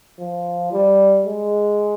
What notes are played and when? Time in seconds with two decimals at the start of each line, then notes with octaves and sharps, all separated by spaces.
0.19 F3
0.73 G3
1.26 G#3